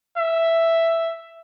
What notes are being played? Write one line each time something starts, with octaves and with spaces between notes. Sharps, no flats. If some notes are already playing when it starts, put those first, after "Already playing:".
E5